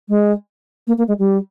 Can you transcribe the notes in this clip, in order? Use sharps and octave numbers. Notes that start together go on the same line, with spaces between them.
G#3
A#3
A#3
G#3
G3